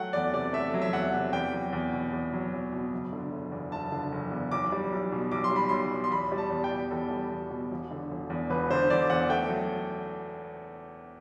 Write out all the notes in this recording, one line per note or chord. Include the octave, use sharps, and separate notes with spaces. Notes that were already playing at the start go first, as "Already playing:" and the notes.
Already playing: F#3 A3 F#5 G5
E2 D5
C3 D5
A3 E5
F#3
E5
E2 F#5
C3
E2 G5
F#3
E2
B2
E2
F#3
E2
B2
F#1
D3
F#1
E2
F#1 A5
D3
F#1
E2
B1 D6
G3
B1
B2
B1 D6
C6
G3 B5
B1 C6
B2
C6
E2 B5
G3
A5
E2
G5
B2
E2 A4
G3
E2
B2
E1
D3
E1
E2
E1 B4
D3 C5
E1 D5
E2 F#5
A3 G5
F#3